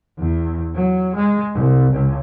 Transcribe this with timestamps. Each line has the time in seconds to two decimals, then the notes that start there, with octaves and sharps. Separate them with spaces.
0.19 E2
0.75 F#3
1.15 G#3
1.54 C2
1.92 C#2